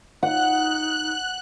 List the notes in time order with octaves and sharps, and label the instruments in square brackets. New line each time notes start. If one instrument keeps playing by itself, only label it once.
[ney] D#4 [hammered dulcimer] F#5 [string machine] F#6